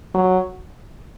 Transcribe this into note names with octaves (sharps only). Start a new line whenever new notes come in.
F#3